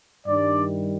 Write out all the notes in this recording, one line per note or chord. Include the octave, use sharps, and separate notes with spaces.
G2 D#3 G3 D4 D5